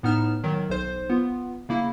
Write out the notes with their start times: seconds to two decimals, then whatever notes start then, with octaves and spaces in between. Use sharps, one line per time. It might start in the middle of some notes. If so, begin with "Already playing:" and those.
0.03 A2 B3 D#4 F6 E7
0.43 D#3 F#3
0.69 B1 C5
1.09 B3 F4
1.69 C#3 A#3 E4